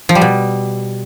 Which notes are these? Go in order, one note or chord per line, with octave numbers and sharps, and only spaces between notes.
F3
G3
B2